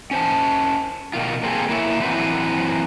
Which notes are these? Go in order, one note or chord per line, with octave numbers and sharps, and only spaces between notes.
C#4 C5 A5
B2 D#3 F4
A#3 C4 F4 G#4 A4
A#3 E4 C#5 E5
E3 F#3 C4 F#4 B4 C5